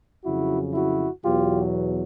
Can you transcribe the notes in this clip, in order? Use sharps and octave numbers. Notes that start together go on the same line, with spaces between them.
F2 C#3 F#3 E4 F#4
E4 F#4
E2 B2 F#3 F4 G4